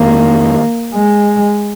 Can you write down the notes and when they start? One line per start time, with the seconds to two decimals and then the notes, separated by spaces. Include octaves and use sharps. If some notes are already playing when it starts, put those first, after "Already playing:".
Already playing: F2 D#3 G#3 A#3
0.94 G#3